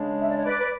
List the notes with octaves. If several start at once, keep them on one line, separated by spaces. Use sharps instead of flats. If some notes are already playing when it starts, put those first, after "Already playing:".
Already playing: C#3 G#3 D4
E5
D5
C#5
B4 D5
B4